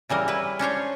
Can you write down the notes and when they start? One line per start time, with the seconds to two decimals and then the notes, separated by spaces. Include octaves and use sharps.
0.09 C#3 E3 G3 A#4
0.28 E4 B4
0.59 C#4 D4 C5 C#5